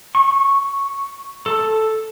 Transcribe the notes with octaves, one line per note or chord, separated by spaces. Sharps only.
C#6
A4